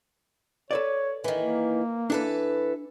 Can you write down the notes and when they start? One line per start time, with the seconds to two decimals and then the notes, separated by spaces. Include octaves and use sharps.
0.71 A4 B4 C#5 D5
1.24 D#3 E3
1.38 A#3
2.10 E3 D4 A4 B4